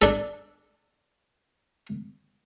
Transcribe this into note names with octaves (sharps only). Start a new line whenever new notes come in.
D4 A4